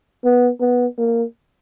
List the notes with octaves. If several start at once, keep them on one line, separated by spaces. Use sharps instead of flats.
B3
B3
A#3